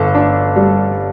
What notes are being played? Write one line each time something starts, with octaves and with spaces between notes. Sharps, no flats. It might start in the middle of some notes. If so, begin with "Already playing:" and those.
Already playing: G1 A4
D4
G3